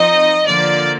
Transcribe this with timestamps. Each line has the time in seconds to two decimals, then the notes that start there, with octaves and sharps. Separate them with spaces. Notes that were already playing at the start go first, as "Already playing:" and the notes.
Already playing: F3 C4 D#4 D#5
0.46 D3 F3 A#3 D5